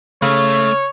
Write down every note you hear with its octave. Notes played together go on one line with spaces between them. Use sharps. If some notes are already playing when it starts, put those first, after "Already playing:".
C#3 A3 C#5